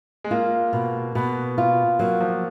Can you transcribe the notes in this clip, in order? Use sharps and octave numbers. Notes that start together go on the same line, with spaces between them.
G#3
A#3 F4
B2
B2 B3
F4
F#3 A#3
F3